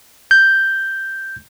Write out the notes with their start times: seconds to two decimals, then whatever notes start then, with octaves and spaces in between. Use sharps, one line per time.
0.31 G6